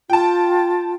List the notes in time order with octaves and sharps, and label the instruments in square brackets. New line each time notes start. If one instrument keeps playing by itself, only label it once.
[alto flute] F4 [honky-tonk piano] G5 A5